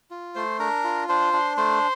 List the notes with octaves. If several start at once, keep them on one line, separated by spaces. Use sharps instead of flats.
F4
A3 C5 C6
D4 A#4 A#5
F4
D4 C5 C6
D4
A3 C5 C6